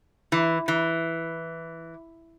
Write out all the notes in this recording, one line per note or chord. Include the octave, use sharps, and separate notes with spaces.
E3
E3